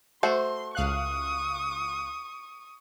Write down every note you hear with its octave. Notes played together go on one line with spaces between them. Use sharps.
A3 F#4 C5 C6
C#2 F5 C#6 D#6 F#6